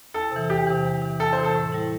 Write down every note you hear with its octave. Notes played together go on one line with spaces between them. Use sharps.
E2 A4
C3 E3
E2 G4
C3 E3
E2
C3 E3
E2 A4
C3 E3 C5
A4
A2
G3 E4